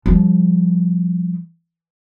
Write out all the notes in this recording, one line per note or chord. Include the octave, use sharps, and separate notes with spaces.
F3 G3